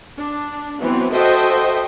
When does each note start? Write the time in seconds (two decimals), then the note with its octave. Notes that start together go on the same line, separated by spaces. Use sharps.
0.17 D4
0.81 E3 F#3 B3 C4
1.12 F#4 A4 C5 D#5 E5 G5